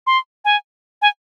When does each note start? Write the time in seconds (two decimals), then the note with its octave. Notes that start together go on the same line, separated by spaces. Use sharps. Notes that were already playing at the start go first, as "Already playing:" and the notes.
0.07 C6
0.45 G#5
1.02 G#5